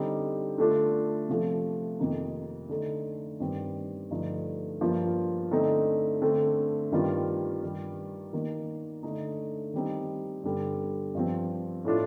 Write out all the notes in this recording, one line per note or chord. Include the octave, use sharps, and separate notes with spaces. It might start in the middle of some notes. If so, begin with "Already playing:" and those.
Already playing: D3 G3 C4 D#4
D3 A3 D4 F4
C3 F3 A3
F2 C3 D#3 A#3 D#4
D3 A3 D#4
G2 D#3 G3 C4
G2 D3 F3 A3 D#4
G2 F3 A#3 F4
D3 A3 C4 D#4
D3 A3 C4
G2 D#3 G3 C4 F4
G2 D#3 G3
D#3 A#3 D#4
D3 A3 D#4
D#3 G3 C4 D#4
G2 D3 G3
G2 F3 C4
A2 A3 D4 F4